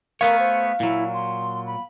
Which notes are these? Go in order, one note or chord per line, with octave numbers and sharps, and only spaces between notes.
A3 B3 A#4 C#5 F5
C5
A#2 F#3 E4
C6
B5